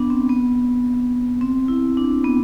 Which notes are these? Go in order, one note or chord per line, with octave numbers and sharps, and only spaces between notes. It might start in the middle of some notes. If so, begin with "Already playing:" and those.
Already playing: B3 D4
C4
B3
C4
E4
D4
B3